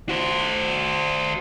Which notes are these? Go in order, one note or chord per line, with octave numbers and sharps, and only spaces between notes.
F#4 C5